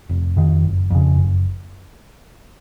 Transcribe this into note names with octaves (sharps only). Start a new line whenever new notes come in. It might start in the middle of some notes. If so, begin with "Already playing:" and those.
F1
F2 D#3
F#1
F2 C#3
F#1